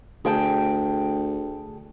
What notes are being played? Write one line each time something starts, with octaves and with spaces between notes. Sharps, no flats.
D2 G#4 G5 A5